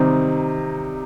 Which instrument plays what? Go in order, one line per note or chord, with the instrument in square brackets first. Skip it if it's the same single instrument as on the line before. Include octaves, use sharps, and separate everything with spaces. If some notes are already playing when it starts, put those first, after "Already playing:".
Already playing: [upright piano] C3 D#3 G3 C4 D#4